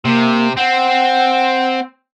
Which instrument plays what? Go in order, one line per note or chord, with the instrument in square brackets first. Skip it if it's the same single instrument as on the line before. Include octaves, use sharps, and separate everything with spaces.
[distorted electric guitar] C3 [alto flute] A#3
[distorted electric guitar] C4 [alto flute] F#5